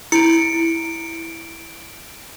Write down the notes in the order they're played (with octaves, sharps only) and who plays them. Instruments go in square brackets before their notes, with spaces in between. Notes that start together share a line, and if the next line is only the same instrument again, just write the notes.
[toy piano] E4 [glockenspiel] C#7 D7